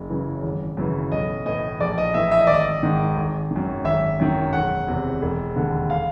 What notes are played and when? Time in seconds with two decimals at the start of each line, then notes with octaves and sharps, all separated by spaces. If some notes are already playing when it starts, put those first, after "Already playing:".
Already playing: F#1
0.10 F#2 C#3 E3
0.43 G#1
0.77 F#2 C#3 E3
1.11 B1 D#5
1.46 A2 E3 D#5
1.80 A#1 D5
1.98 D#5
2.14 A2 E3 E5
2.31 E5
2.40 D#5
2.47 G#1 D5
2.54 D#5
2.83 G#2 D#3
3.16 G#1
3.51 D#3
3.56 F#2
3.84 G#1 E5
4.20 F#2 D#3
4.53 E1 F#5
4.87 E2 C3
5.22 E1
5.56 D#2 D3
5.90 F5